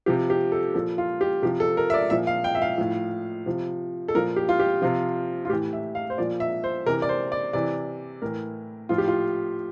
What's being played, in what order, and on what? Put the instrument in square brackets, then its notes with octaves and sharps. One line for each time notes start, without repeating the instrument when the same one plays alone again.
[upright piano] C3 F3 G4
G4
A4
A#2 F3 A4
F4
G4
C3 F3 G4
A4
A#4
E5
D5
A#2 F3 E5
F5
G5
E5
F5
A2 F3
C3 F3
A4
A#2 F3 A#4
G4
F4
G4
C3 F3 F4
F4
A2 E3 G4
E5
F5
C5
A#2 F3 D5
E5
C5
C3 E3 A#4
D5
C5
D5
C3 E3 D5
A2 E3 A#4
A2 F3 F4
G4
F4